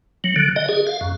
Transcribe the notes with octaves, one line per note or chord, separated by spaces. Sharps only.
F#3
D3
D#5
G#4
F5
F#2